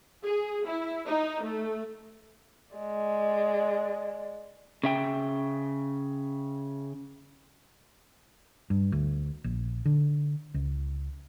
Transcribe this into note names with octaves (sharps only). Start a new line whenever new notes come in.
G#4
E4
D#4
A3
G#3 D5
C#3 E5 G5
G2
D2
A#1
D3
C#2